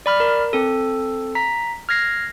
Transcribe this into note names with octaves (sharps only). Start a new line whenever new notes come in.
D5 B5 F6
A#4
C4 A4
A#5 B6
F6 G#6 A#6 C7